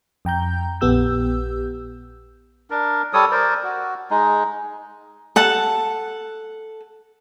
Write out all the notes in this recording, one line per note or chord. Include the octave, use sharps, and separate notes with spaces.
F2 G5 A#5 G6
A#1 B3 G4 E6 G6
D4 A#4
G3 A4 C#5 D#6
A#4 C5 D5
F#4
G#3 D#4
A4 F#5 A5